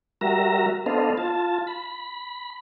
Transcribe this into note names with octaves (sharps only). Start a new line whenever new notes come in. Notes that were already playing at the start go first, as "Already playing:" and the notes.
G3 F#4 A#4 E5 A#5
B3 D4 A4 C5 D#5 F5
F4 A5
B5